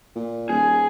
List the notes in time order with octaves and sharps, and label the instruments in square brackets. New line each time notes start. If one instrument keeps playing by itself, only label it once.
[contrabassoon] A#2
[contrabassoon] D#1 [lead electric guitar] G#4